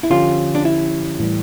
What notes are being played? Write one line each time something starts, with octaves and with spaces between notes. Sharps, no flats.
E4
D3 F3 C#4 F4 G4
D4
E4
A2 E3 G3